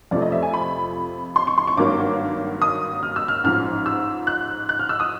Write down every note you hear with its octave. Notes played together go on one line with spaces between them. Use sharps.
F2 C3 F3 A3 D5
D#5
E5
G#5
B5
C6
C#6
C6
C#6
G#1 G2 D#3 F#3 A#3 D6
D#6
F6
E6
F6
A1 G#2 F3 F6
E6
F#6
F#6
F6
E6
D#6